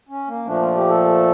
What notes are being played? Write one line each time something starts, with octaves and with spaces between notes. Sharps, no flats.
C#4
A#3
A#2 F3 A3 D4
F4
G4
A4